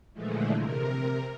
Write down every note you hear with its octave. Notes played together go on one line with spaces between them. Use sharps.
A#2 D3 E3 F3 G#3 A3
C3 A#4